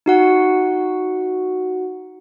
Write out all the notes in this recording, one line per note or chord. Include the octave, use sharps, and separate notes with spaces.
D#4 F#4 F#5